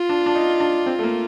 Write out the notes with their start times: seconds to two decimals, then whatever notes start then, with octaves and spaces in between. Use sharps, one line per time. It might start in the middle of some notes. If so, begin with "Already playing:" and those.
Already playing: F4
0.09 D4
0.26 D4
0.35 D#4
0.60 D4
0.86 C4
0.99 A3
1.03 A#3